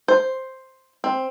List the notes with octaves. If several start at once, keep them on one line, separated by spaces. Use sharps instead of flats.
C5
C4